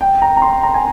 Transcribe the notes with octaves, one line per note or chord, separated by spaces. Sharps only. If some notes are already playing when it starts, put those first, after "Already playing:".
G5
A#5
A#5
C6
A#5
G#5